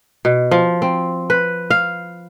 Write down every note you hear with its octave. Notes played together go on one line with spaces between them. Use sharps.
B2
F3
C4
B4
F5